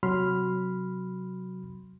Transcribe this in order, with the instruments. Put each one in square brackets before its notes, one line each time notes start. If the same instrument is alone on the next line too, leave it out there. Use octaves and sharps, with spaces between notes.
[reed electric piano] C3 F#3 B5 C6 F6